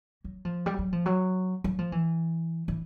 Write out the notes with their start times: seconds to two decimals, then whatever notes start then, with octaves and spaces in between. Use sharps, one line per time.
0.24 F#3
0.45 F3
0.66 G3
0.78 F#3
0.92 F3
1.06 F#3
1.64 F#3
1.79 F3
1.92 E3
2.68 E3